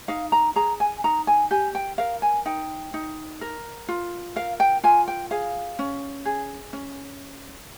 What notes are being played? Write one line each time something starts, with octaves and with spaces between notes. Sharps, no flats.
D#4 F5
A#5
G#4 A#5
G#5
D#4 A#5
G#5
G4 G#5
G5
A#4 F5
G#5
D#4 G5
D#4
A#4
F4
A#4 F5
G5
F4 G#5
G5
G#4 F5
C#4
G#4
C#4